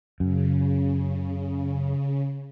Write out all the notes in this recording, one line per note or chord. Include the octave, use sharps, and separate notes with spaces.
F#2 C#3